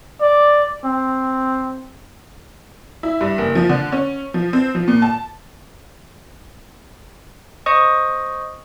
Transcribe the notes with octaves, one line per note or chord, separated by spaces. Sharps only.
D5
C4
E4
G2
F#1
F3
D3
C#4
F3
C4
F3
A#2
A5
C5 D#5 C#6 D#6